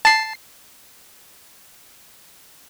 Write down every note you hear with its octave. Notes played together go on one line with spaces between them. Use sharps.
A5 C7